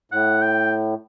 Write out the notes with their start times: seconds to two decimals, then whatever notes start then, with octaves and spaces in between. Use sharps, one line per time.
0.12 A2 F#5
0.42 G5